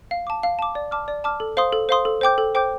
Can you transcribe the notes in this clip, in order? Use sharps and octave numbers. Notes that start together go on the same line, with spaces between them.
F5
A5 D6
F5
A5 D6
D5
A5 D6 F6
D5
A5 D6 F6
A4
C5 F5 C6 D#6
A4
C5 F5 C6 D#6
A4
C5 G5 D6 G6
A4
C5 G5 D6 G6